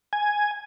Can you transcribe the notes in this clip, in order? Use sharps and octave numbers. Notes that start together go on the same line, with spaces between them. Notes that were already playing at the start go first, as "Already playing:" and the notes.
G#5